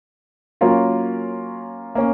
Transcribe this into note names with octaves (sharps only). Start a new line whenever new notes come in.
F#3 A#3 C#4 F4 A#4
A#3 C#4